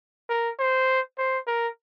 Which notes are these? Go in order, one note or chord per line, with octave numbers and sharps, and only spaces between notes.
A#4
C5
C5
A#4